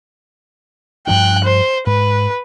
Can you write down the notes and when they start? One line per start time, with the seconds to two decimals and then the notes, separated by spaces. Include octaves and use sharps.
1.07 G2 F3 D4 G5 F#6
1.45 C5
1.87 G#2 B4